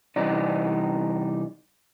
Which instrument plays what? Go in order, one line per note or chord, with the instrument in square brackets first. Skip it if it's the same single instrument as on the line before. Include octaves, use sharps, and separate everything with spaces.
[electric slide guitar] C3 E3 G3 D#4 D5